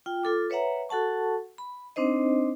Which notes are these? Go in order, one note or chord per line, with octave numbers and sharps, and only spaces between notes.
F4 G5
F4 A4 D6
B4 C#5 E5 F#5 A#5
F#4 A4 F#5 A5 C#6
B5
C4 D4 D#4 C5 D#5